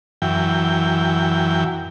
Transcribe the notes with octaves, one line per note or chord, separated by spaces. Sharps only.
F#2 E3 G5